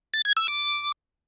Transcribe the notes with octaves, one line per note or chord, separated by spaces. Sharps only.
A6
G#6
E6
D6